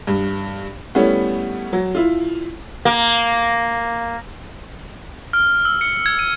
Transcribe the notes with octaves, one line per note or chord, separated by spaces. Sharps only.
G2
G3 A3 B3 C#4 E4
F#3
E4 F4
A#3
F6
E6
C#7
G#6
D#7